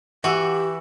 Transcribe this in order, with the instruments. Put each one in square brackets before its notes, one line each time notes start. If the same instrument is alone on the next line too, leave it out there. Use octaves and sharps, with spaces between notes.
[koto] E3 F#4 [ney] G4 [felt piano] F#5 E6